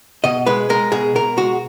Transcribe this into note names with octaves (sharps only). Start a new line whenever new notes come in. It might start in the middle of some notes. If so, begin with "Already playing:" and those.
B2 D#5
G#3 B4
G#3 A#4
B2 G#4
B2 A#4
G#3 F#4